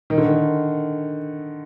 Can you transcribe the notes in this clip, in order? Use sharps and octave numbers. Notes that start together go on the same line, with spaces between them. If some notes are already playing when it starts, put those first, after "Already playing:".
D#3
D3
D#3